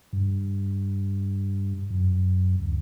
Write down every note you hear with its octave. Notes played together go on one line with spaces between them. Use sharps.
G2
F#2
D2